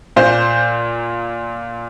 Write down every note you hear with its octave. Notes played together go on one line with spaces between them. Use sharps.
A#2 A#3 C5